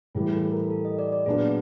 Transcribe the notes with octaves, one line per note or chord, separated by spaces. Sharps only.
A2 E3 G3 G#4
A4
A#4
A4
D#5
D5
D5
A#2 F#3 B3 D4 F4 G#4